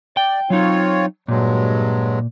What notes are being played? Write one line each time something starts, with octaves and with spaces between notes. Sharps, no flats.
D5 G5
F#3 C4 D#4 F4 C#5
G2 A#2 F#3 G#3